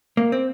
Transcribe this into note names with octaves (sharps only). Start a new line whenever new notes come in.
A#3
C4